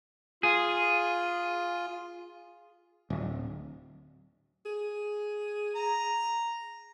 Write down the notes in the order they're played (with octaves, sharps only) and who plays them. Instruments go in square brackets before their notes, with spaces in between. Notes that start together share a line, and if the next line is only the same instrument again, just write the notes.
[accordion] F4 [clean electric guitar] G#4
[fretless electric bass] D1
[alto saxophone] G#4
[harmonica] A#5